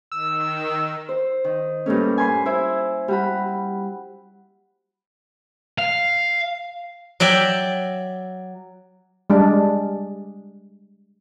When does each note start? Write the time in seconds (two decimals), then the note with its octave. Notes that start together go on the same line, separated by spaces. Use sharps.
0.12 D#3 E6
1.09 C5
1.44 D#3
1.86 G2 A#2 A3 C#4
2.18 G#5 B5 C6
2.46 E4 C5 E5
3.08 G3 F#4 B5
5.78 F5
7.20 F#3 D5 E5 G5
9.30 G3 G#3 D4